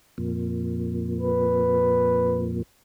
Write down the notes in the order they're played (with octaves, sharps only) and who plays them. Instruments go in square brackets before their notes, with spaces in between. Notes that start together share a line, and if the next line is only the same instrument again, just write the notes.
[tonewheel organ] F2 A#2
[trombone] B4